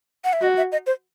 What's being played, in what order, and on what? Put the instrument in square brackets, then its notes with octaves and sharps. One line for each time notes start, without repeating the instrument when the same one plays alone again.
[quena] F#5
E5
[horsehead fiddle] F#4 [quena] D#5
[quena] E5
D#5
C5